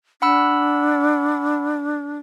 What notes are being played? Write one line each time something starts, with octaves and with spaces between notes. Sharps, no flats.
D4 F#5 B5 E6